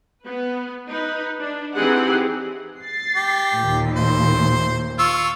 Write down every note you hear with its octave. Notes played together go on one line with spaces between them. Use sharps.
B3 B4
D#4 B4
D4
E3 C4 D#4 G4 G#4 F#5
A6 C7
G4
D#2 A#2
C5
F4 C#6 E6